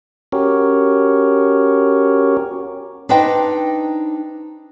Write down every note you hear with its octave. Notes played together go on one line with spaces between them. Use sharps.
C#4 F#4 G4 A#4 C#5
D4 D#4 B4 C5 D#5 G5